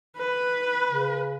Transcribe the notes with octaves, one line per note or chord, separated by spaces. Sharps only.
B4
C#3